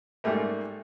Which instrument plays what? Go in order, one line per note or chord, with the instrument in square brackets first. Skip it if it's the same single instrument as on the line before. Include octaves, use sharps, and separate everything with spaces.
[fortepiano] G#2 G3 A3 A#3